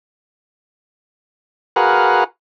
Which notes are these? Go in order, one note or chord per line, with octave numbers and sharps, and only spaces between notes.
F#4 G#4 A#4 B4 F5 F#5